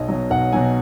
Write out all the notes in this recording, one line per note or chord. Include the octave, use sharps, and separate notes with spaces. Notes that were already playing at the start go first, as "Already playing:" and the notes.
Already playing: B1 D#5
B2 F#3
B1 F#5
B2 F#3 G#5